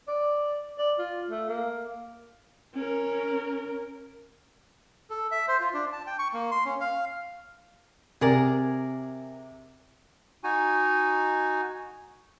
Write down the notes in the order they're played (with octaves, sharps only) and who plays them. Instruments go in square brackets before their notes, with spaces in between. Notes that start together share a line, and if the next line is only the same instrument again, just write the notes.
[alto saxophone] D5
D5
F4
A3
A#3
[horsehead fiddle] C#4 A#4
[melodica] A4
E5
C5
F4
D4
A5
G5
C#6
A#3
C6
C#4
F5
[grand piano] C3 [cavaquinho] G#4 A#4 D5
[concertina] D#4 F#4 G#5